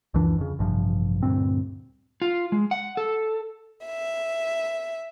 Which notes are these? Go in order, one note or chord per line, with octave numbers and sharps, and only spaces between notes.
C#2 F#2 E3 D4
F2 C#3
A1 G2 C3 F3
D2 G2 A#2 C4
F4
G#3
F#5
A4
E5